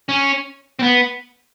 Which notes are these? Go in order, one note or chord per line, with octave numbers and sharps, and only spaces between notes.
C#4
C4
B3